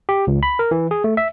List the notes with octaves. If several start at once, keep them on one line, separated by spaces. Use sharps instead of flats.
G4
C#2
B5
A#4
E3
G#4
A3
E5